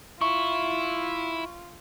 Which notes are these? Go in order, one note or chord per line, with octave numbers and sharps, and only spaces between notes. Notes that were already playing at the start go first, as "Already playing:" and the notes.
E4 F4 C#6